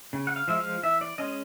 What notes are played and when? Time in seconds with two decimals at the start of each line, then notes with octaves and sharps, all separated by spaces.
0.13 C#3
0.27 F#5
0.36 F5
0.48 F3 G#3 E5
0.60 F5
0.83 E3 E5
1.01 D5
1.18 G#3 C#4 D#5